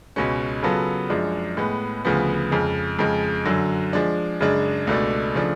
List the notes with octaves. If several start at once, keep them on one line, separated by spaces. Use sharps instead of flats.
C#2 B2 G#3 C#4
C#3 F#3 B3 F4 A4
F#2 F3 G#3 D4
A2 G#3 B3
D2 C#3 F3 B3
F2 C#3 G#3
F2 C#3 G#3
F#2 D3 F#3
F3 G#3 D4
F#2 C#3 G#3 D4
C#2 B2 A3 D4
C#3 F3 A3 D4